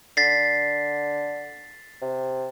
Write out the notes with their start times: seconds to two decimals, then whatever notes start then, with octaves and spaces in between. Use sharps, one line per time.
0.17 D3 A6 B6 C7
2.02 C3